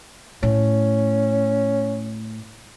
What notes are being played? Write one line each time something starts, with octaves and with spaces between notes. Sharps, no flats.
A2 C#4